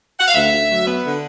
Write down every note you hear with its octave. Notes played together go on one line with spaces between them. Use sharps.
F#5
F5
D2 E5
D2
F#3
B3
D3